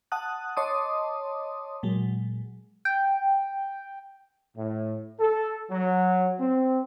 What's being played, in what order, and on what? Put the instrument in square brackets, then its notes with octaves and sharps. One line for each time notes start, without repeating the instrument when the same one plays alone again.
[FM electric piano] F#5 A5 D#6 F#6
C#5 D#5 A5 C6 D6 D#6
A#2 F#3 G#3
[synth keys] G5
[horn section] A2
A4
F#3
C4